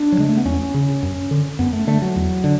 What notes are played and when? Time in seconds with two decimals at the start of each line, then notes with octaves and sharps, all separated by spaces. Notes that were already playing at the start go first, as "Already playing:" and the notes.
Already playing: D4
0.12 F#3
0.18 C#3 G#3
0.29 A3
0.37 B3
0.45 E2 C#4
0.74 C#3
1.03 F#2
1.31 D3
1.59 F#2 B3
1.73 A3
1.87 D3 A3
2.02 F#3
2.16 E2
2.44 D3